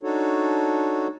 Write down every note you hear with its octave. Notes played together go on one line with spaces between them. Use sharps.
D4 D#4 F#4 A4 C#5